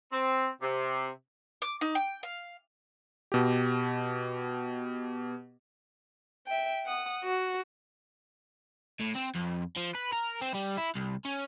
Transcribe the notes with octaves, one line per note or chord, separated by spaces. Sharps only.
C4
C3
D6
D#4
G5
F5
B2 G4
E5 G5
F#5 D#6
F#4
A2
C4
F2
F3
B4
A#4
C4
G3
E4
C2
C#4